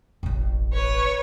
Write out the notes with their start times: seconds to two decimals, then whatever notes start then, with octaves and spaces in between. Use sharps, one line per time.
0.23 E1 A1
0.73 B4 C#5